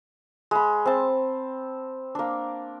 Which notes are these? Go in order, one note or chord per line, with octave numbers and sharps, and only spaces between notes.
G#3 B5
C4 A5
A#3 D4